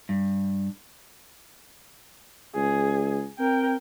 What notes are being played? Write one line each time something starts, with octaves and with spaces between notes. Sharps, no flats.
G2
C#2 G#4
C4 A#4 G5